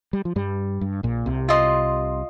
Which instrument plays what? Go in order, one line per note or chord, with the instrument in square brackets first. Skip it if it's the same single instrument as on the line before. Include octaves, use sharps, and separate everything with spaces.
[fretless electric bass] G3
F3
G2 G3
G2
A#1 A#2
C2 C3
[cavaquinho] F4 D#5 C6